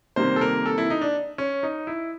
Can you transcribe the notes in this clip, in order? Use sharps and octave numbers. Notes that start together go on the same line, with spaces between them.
C3 D#3 G3 A#3 C5
A4
A#4
A4
E4
D#4
D4
C#4
D#4
E4